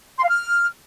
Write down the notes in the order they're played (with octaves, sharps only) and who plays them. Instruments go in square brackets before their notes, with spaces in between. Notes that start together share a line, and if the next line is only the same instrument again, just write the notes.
[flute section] C6
F5
F6